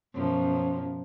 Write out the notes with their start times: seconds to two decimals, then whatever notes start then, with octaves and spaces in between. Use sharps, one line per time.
0.14 F#2 B2 F3